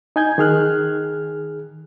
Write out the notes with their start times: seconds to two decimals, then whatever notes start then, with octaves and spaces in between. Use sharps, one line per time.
0.16 D#4 G#5 G6 G#6
0.38 D#3 G#4 F6 F#6